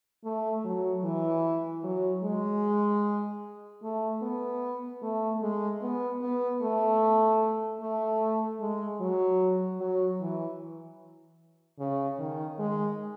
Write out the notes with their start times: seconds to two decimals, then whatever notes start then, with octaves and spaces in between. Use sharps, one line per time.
0.24 A3
0.64 F#3
1.04 E3
1.84 F#3
2.24 G#3
3.83 A3
4.23 B3
5.02 A3
5.42 G#3
5.82 B3
6.22 B3
6.62 A3
7.81 A3
8.61 G#3
9.00 F#3
9.80 F#3
10.20 E3
11.79 C#3
12.19 D#3
12.59 G#3